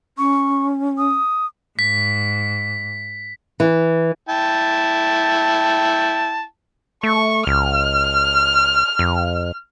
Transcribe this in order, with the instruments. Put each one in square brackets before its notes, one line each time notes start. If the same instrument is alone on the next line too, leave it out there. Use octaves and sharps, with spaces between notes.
[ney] C#4 [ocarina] C#6
[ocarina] D#6
[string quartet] G#2 [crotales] B6
[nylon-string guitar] E3
[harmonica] E4 G5 A5
[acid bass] A3 [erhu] C#6
[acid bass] C#2 [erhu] F6
[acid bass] F2